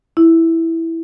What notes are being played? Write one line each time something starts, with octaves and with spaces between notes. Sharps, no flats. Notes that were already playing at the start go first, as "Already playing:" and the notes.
E4